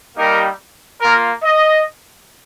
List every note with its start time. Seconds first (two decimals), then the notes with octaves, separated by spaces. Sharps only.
0.17 G3 A#3 D#4 G4 A#4
1.01 A#3 F4 A#4
1.43 D#5